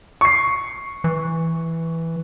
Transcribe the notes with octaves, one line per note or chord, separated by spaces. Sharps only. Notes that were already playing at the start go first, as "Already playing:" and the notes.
C#6 C7
E3